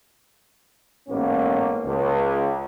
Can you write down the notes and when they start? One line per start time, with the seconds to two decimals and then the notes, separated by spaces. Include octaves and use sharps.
1.09 A1 G#2 A#3 B3 C#4
1.85 C#2